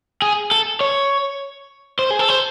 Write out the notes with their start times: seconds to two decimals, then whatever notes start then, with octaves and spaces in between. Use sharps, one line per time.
0.22 G#4
0.51 A4
0.81 C#5
1.99 C5
2.11 G#4
2.19 A4
2.29 C5